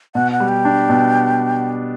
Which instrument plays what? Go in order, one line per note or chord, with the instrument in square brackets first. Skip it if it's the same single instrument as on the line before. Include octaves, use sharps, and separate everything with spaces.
[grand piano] B2 [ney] F#5
[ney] F#5
[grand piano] G3
[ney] G5
[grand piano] D4
B2